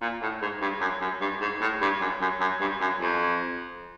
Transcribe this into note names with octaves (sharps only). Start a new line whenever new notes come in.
A#2
A2
G#2
G2
F#2
F#2
G2
G#2
A2
G2
F#2
F#2
F#2
G2
F#2
F2